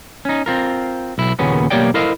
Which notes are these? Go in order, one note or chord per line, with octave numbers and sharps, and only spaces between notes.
C#4 D#4
C4 F4 A#4
B1 E4
D#2 A#2 C#3 B3 C#4
B1 A#3 G4 C#5 D5 G5
E4 A4 A#4 C5 D#5 F5